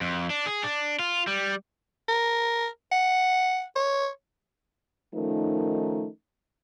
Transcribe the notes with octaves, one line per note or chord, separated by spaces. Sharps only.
F2
D4
G#4
D4
F4
G3
A#4
F#5
C#5
D#3 F3 A3 C#4 D#4 A#4